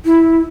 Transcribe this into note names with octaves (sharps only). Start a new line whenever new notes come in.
E4